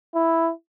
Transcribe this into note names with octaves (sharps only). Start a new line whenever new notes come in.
E4